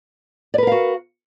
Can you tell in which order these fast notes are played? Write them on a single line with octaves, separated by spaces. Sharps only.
D5 B4 A#4 F5 F#4